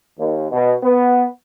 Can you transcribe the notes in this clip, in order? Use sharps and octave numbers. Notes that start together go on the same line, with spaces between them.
D#2
B2
B3